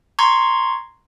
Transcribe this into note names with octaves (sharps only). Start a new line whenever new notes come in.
A#5 C6 C#6 G#6